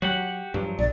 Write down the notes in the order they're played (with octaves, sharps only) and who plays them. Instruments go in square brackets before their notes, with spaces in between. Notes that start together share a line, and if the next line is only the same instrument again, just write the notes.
[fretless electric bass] F#3 [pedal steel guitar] F#4 G4 F#5
[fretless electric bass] G2 [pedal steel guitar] F3 F#3
[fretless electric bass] A#1 [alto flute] D5